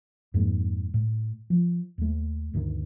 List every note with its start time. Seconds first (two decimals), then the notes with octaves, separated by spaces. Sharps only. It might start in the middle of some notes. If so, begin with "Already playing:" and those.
0.34 F2 G#2 G#3 A#3
0.94 A2
1.50 F3
1.98 D#2 A3
2.54 G1 D2 A#2 D#3